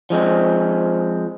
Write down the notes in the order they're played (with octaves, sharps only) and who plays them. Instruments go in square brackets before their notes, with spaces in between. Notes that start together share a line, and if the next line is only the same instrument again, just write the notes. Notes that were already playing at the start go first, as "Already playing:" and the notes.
[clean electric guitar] F3 G#3 C4